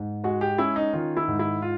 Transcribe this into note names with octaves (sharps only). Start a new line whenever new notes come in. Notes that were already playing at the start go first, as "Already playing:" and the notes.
Already playing: G#2
G#3 F#4
G4
C#4 E4
D#4
D#3 F4
E4
G#2
E4
F4